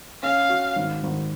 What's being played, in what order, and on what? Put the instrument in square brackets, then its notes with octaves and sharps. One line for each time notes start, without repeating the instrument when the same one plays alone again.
[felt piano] C#4 [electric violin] F5
[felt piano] F#4
G#1
G#1